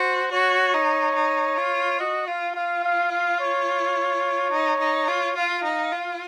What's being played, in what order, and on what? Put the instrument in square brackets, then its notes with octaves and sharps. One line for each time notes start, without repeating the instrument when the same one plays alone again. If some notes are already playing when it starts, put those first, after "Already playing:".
Already playing: [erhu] F#4 [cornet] C5
[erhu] F#4 [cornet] C#5
[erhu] D#4
D#4
F4
[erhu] F#4 [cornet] D#5
[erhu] F4 [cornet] F5
[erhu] F4 [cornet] F5
[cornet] F5
F5
C#5
[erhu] D#4
D#4
F4
[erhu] F4 [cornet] F5
[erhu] D#4
F4